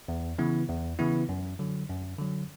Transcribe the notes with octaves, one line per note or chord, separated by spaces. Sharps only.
E2
C#3 E3 B3 E4
E2
C#3 E3 B3 E4
F#2
D3 F#3
F#2
D3 F#3